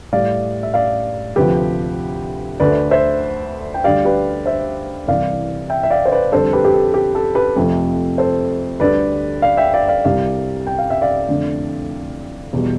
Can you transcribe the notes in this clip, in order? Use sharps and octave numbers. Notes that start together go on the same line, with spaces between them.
A2 G3 D5 F5
E5
D5 F5
D2 C3 F3 G4 B4
D2 D3 A3 B4 D5
C5 E5
G5
D2 D3 G3 D5 F5
G4 B4
C5 E5
C2 C3 E3 D5 F5
E5 G5
E5
D5 F5
C5
B4 D5
F2 D3 G3 A4 C5
G4 B4
G4
A4
G4
A4
G4 B4
F2 C3 F3 A3
A4 C5
D2 D3 G3 B4 D5
D5 F5
E5 G5
D5 F5
D5 F5
C2 C3 G3 D5 F5
G5
F5
E5
D5 F5
F2 D3 A3
E2 B2 G3